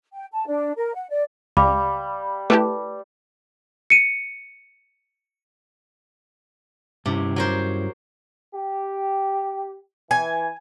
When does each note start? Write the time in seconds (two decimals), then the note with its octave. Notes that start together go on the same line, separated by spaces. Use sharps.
0.13 G5
0.32 A5
0.47 D4
0.77 A#4
0.94 F#5
1.10 D5
1.57 C#2 G3 F5 B5 D6
2.50 A3 E4 G4 B4 A5 D6
3.90 C#7 D#7
7.06 G2 C3 C#4 E4
7.36 F#3 A#4 C5
8.54 G4
10.11 E3 G#5